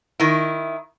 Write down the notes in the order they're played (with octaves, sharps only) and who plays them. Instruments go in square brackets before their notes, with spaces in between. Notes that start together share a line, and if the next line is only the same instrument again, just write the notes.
[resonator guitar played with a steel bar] D#3 E4